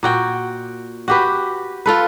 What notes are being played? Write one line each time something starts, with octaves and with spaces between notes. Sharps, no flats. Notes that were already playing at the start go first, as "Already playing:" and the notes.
A#2 F#4 G5
F#4 G4 B4
F4 A4 B4